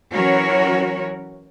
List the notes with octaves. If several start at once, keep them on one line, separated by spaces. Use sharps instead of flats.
E3 F#3 C#4 F#4 A#4 C#5